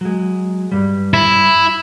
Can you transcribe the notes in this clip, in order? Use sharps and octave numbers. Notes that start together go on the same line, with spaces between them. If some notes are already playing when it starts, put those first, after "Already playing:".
F#3 G#3
G2 G3
E4